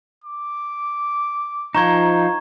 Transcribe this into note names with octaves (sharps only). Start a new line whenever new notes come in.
D6
F3 D#4 A#5 C#6 G#6